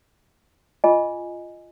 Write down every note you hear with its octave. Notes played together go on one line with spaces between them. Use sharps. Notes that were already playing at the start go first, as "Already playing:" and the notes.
F4 G#4 D#5 G#5